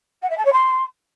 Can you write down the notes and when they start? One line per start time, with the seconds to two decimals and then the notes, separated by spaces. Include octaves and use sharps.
0.22 F#5
0.30 E5
0.37 A5
0.45 C#5
0.52 C6